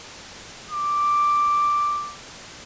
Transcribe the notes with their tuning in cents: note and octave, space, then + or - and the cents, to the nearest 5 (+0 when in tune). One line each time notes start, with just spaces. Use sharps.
D6 +0